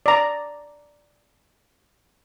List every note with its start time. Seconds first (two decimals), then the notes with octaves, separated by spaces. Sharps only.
0.06 D5 A#5